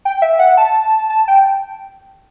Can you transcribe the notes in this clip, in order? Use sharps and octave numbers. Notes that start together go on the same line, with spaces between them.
G5
E5
F#5
A5
A5
G5